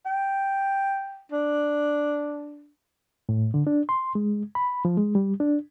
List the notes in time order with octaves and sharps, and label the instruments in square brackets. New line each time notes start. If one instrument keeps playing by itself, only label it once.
[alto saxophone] G5
D4
[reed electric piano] A2
D3
D4
C6
G#3
B5
F3
G#3
G3
D4